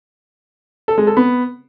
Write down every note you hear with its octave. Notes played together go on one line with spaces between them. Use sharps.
A4
G#3
A4
B3